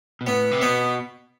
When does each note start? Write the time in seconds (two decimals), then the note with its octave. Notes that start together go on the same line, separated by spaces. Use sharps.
0.21 B2
0.27 A2 B3
0.51 C3
0.62 B2 B3